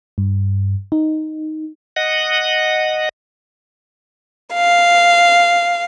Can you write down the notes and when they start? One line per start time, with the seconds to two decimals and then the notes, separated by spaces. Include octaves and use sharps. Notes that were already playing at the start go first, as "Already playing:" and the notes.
0.18 G2
0.92 D#4
1.96 D#5 F#5
4.53 F5